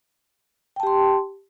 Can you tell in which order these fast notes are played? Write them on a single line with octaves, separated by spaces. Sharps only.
G5 A5 G4 C6